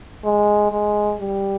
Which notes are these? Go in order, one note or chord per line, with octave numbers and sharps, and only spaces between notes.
G#3
G#3
G3